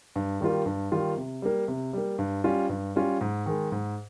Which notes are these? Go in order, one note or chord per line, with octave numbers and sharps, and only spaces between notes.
G2
D#3 G3 A#3 F4
G2
D#3 G3 A#3 F4
C3
G3 A#3
C3
G3 A#3
G2
G3 C#4 F4
G2
G3 C#4 F4
G#2
D#3 G#3
G#2